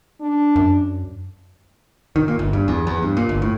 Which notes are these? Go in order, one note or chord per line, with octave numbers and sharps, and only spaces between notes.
D4
F#2
D#3
A#2
G1
G2
E2
E2
G2
A#2
G1
A2